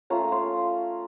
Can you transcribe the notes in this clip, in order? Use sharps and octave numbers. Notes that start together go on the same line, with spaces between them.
A3 C#4 F4 A#5
C6